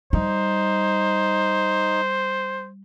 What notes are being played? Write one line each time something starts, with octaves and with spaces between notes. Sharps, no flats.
G3 D#4 C5